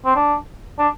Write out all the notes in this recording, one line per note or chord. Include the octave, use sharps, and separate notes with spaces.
C4
D4
D4